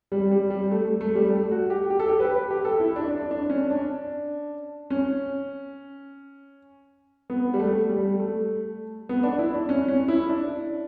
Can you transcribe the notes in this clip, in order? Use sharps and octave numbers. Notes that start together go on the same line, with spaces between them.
G3
G3
G3
A3
A3
G3
A3
F#4
G4
G4
A4
G4
B4
G4
A4
E4
D4
D4
D4
C#4
D4
C#4
B3
G3
A3
G3
A3
B3
D4
E4
D4
C#4
C#4
E4
D4